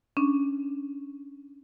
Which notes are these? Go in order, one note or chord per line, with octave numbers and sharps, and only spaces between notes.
C#4 D4